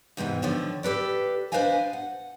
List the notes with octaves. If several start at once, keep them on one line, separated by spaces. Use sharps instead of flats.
E2 G#2 C3 E3
D3 D#3 F3 C#4
G4 A4 B4 D5
D4 B4 C5 D#5 F5 G#5
F#5